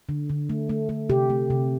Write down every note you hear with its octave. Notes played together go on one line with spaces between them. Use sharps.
D3
D3
A3
A3
A3
C3 G4
A3
C3